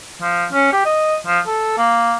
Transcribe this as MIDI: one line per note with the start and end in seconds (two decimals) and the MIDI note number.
0.21 0.46 53
0.52 0.69 61
0.73 0.80 67
0.85 1.16 75
1.26 1.39 53
1.46 1.75 69
1.77 2.16 58